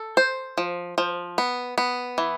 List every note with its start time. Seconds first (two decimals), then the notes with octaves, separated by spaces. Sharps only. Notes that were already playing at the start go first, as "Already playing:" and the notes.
Already playing: A4
0.17 C5
0.58 F3
0.98 F3
1.38 B3
1.78 B3
2.18 E3